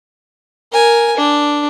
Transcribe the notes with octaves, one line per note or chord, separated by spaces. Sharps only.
A#4 G#5
D4